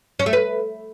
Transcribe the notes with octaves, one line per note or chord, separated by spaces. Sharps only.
C#4
A3
B4